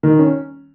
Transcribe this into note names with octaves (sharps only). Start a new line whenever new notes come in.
D#3
C#4